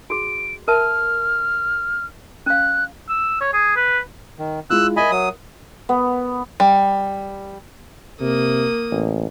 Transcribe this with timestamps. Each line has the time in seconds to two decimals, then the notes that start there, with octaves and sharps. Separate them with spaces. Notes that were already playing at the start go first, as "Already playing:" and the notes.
0.10 F#4 G#4 D7
0.68 A#4 E5 A5 F6
2.46 C#4 F5 F#6
3.09 E6
3.41 C#5
3.53 G#4
3.76 B4
4.39 D#3
4.70 G#3 E4 F4 E6 F#6
4.96 A#4 D#5 E5 G#5 B5
5.11 F#3 D#6
5.89 B3
6.60 G3
8.20 C3 A#3 D#6
8.91 A1